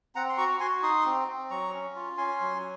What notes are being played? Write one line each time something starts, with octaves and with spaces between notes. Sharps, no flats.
C4 F#5 A#5
C6
F#4 A#5 C#6
F#4 G#5 C6
D#4 C6 D#6
C4
C4
F#3 A#5 C#6
C#4
F4
C#4 G#5 C6
F#3